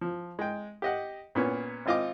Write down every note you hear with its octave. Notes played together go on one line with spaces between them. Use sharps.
F3
G#3 G5
G4 D#5 F#5
A#2 B3 C#4
G#1 C4 F4 D#5 F5 D6